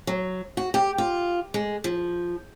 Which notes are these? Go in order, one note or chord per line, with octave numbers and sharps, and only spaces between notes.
F#3
F#4
G4
F4
G#3
F3